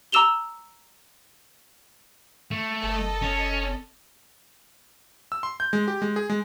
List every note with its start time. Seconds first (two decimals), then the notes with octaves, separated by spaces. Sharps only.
0.12 A#5 D6 E6 E7 F7 G7
2.51 A3
2.83 F#1 A4 D#5
3.22 C#4
5.32 E6
5.43 C6
5.60 G6
5.73 G#3
5.88 G4
6.02 G#3
6.16 G#4
6.30 G#3